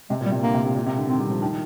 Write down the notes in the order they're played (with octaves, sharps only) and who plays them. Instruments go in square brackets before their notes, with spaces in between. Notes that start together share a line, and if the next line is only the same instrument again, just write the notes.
[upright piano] C3 [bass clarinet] G#3
[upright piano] A#2
[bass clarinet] G3
[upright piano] C3
[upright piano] D3 [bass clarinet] A#3
[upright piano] C3
C3
A#2
C3
D3
[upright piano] D#3 [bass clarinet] C4
[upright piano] G3
F3
[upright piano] D#3 [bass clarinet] D4